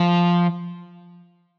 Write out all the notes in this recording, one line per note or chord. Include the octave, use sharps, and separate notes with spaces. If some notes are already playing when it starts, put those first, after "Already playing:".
Already playing: F3